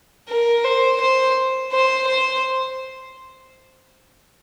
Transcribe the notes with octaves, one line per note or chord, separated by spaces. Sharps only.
A#4
C5
C5
C5
C5